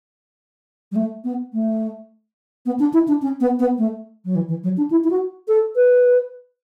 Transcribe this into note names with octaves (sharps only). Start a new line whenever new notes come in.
G3
A3
B3
A3
B3
D4
E4
D4
C#4
B3
B3
A3
F#3
E3
E3
F#3
D4
E4
E4
F#4
A4
B4